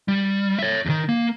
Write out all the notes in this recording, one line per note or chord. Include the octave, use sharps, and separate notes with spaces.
G3
C#5 E5
E2 D#3
A#3